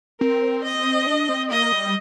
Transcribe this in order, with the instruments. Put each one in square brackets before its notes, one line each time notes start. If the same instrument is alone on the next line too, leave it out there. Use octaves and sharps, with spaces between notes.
[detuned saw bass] C4 [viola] A#4
[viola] D#5
[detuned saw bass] D4
C4
[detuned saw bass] A#3 [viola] D#5
[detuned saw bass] G3